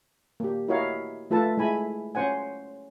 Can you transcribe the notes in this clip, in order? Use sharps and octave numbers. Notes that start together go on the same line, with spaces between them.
A#3 G4
E4 F#4 A#4 C#5 D#5 F5
A3 F4 A4 B4 A5
G#3 E4 G#5 B5
C#4 C5 F#5 G#5